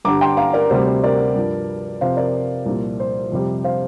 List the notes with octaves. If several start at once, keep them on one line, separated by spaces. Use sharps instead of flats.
G2 D3 G3 A#5 D6
G5 C6
F5 A#5
A#4 D5
D2 C3 G3 C5
C5
A#4 D5
G2 F3
F2 C3 F3 C5 F5
A#4 D5
C2 A#2 F3
C5
F2 C3 G3
C5 F5